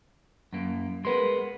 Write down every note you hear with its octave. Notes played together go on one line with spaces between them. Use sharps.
F#2 A#3
G#3 B3 A#4 B4 C6